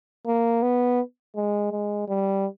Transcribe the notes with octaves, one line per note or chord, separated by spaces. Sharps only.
A#3
B3
G#3
G#3
G3